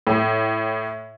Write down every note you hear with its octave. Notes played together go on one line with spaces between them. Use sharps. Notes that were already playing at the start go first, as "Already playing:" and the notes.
A2